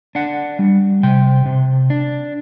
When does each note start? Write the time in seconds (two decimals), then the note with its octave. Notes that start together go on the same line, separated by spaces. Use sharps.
0.15 D4 F#5
0.59 G3
1.03 C3 G5
1.46 C3
1.90 D4